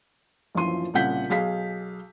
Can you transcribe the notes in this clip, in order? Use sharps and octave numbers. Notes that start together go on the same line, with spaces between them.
A#1 F#2 E3 F3 C6 D#7
C2 A#2 C#3 F#5 G6 B6
B1 G#4 F5 B6